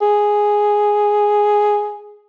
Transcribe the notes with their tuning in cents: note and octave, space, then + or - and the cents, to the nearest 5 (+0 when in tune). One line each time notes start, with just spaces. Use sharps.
G#4 +0